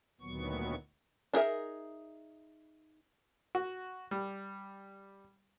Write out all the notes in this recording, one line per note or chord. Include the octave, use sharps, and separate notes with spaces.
D2 A#2 D#3 F#3 B3 C#6
D4 D#4 G#4 A#4 E5
F#4
G3